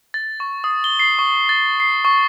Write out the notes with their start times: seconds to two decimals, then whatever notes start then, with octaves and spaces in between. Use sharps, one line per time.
0.14 A6
0.40 C#6
0.64 D#6
0.84 G7
0.99 C7
1.19 C#6
1.49 A6
1.80 C7
2.05 C#6